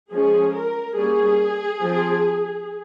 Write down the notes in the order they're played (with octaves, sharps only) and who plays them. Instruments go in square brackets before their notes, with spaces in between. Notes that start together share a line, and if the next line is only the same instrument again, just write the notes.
[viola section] F3 G#3 C#4 G#4
A#4
G3 A#3 C#4 G#4
F3 C4